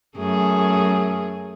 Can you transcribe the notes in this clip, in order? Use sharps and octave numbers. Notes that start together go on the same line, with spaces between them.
F#2 A3 G#4